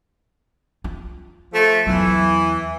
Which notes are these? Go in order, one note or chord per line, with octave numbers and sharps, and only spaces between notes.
F4
F3 A3
E2 E3 F#3